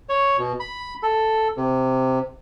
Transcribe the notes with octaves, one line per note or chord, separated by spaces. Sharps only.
C#5
B2
B5
A4
C3